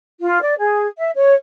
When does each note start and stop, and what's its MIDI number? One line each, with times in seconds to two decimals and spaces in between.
0.21 0.41 65
0.41 0.54 74
0.58 0.86 68
0.97 1.10 76
1.15 1.33 73